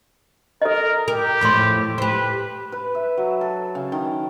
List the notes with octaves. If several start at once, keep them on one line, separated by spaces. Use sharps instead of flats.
A4 A#4 D#5
G4 A#4
E2 A2 F3 B5 C6
G4 B4 C5
B4
E5
F#3
A4
C#3
D#3